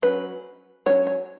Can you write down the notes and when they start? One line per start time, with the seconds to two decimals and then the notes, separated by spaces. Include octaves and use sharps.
0.02 F#3 C#4 B4
0.86 F#3 C#5
0.89 C#4
1.07 C#5